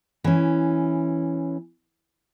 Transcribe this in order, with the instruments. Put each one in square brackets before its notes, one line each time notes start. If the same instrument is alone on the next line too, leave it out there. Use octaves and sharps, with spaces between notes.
[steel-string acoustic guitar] E3 C#4